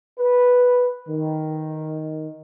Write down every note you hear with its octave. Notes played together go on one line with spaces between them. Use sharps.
B4
D#3